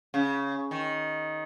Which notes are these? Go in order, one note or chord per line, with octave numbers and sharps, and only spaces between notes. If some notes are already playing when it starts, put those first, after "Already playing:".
C#3
D#3